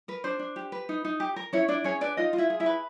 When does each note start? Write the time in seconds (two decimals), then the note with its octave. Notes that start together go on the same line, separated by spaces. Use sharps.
0.08 A#4 B4
0.24 D4 C5
0.39 D4
0.56 G4
0.72 B4
0.89 D#4
1.05 D#4
1.20 G4
1.36 A#4
1.53 C#4 E4 C#5
1.68 D4 E4 D5
1.84 C#4 G#4 C#5
2.01 D4 B4 D5
2.17 D#4 F4 D#5
2.33 F4
2.38 E4 E5
2.50 G#4
2.60 E4 E5
2.66 B4